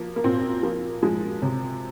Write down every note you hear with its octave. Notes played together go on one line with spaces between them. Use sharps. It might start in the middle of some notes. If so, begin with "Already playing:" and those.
Already playing: F3 A#3
A#3
A#2 C4
F3 A#3
F3 G#3
C3